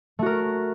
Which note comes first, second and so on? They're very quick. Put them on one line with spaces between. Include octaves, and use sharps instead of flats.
A3 F#4 A#4